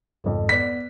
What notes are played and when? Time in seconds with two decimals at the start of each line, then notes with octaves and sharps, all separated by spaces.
0.24 G#1 F2
0.49 B3 D5 B6